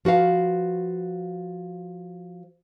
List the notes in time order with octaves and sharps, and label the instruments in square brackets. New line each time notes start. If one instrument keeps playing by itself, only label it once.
[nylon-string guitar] F3 F#4 B4 F5